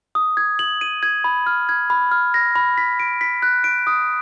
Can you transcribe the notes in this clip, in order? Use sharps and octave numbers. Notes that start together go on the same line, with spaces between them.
D#6
G#6
F#7
D#7
G#6
B5
F6
G#6
B5
F6
A#6
B5
B6
D7
B6
F#6
D7
D#6